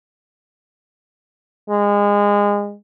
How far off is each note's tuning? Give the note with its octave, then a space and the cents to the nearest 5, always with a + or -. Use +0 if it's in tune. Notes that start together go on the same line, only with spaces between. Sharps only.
G#3 -25